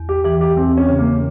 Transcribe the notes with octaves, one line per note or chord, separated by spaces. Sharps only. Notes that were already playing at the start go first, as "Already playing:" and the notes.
Already playing: E2
G4
E3 G4
G4
E2 C4
C#4
C#3
A#3